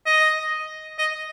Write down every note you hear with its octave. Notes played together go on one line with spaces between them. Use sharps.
D#5
D#5